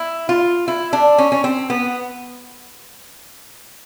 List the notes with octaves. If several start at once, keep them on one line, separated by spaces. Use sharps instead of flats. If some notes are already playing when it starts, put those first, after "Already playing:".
Already playing: E4
F4
E4
D4
C#4
C#4
C4
B3